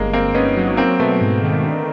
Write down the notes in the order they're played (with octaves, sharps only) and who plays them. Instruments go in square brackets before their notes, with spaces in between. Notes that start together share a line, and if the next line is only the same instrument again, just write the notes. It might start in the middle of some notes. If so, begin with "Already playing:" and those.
Already playing: [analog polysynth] G1 [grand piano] G#3 A#3
[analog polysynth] G1 [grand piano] A#3 C4
[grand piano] B3 C#4 [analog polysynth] D#4
[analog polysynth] F#3
[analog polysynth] F#3 [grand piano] A#3 C4
[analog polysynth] B2 [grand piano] A3 B3
[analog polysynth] G#2
D#3
D3